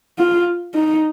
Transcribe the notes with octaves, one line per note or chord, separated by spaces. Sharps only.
F4
D#4